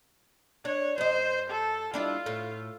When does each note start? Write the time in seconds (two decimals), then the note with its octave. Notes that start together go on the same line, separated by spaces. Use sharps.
0.65 D4 C#5
0.98 F#2 C5 D#5
1.50 A4
1.94 G3 D4 E4 F4
2.26 A2